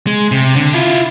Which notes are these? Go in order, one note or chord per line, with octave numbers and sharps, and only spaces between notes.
G#3
C3
D3
E4 F4